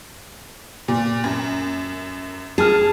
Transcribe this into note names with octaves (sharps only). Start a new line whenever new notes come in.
A#2
F#2
G#4 A5 F6